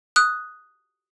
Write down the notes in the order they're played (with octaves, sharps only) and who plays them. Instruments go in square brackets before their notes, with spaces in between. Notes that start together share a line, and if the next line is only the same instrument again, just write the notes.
[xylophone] D#6 F#6